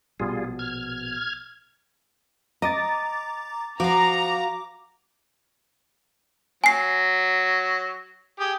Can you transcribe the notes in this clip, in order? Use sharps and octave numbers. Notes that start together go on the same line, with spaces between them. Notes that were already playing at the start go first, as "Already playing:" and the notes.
A#1 B2 G3 F4 G#4
F6 G#6
D#5 A#5 D6 A6
F3 F#4 F5 A#5 D6
F#3 G#5 C7
G4 G#4